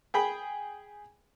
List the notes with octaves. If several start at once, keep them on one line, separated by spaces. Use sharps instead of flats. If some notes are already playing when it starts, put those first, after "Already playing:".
G#4 G5 B5